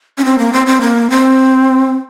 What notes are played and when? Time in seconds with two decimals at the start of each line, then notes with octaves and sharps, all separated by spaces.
0.18 C#4
0.25 C4
0.39 A#3
0.53 C4
0.66 C4
0.81 A#3
1.10 C4